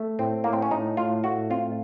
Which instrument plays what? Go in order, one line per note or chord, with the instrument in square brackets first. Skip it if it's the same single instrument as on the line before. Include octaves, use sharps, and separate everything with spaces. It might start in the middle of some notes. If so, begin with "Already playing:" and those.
Already playing: [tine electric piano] A3
[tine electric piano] A2 [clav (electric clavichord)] C4
[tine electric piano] A2 [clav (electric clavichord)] A#3
[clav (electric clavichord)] C4
C#4
[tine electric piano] A2 [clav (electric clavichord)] D#4
[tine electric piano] A2 [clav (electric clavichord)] F4
[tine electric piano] A3 [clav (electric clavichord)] F#4
[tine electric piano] C4 [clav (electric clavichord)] F4